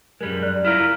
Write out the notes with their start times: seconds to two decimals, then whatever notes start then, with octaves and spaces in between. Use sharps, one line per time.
0.21 F#2 G3 G#3 A#4
0.43 D5 F#6
0.65 E4 F4 A#4 F6 F#6 B6